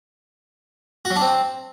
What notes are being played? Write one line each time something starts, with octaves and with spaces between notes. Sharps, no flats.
F#4
F#3
D4
C4